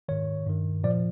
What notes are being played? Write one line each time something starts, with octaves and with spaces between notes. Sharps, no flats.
G#2 D#3 C#5
G2 D#3
A#2 F3 D5